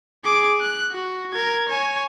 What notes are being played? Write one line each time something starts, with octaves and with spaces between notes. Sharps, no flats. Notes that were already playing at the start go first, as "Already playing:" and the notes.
G#4 D6
F#6
F#4
A#4 G#6
C#5 G#5